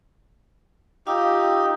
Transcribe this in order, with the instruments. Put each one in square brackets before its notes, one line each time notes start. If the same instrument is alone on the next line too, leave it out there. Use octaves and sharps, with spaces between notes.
[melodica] D#4 G4 [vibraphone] F4 F5 E6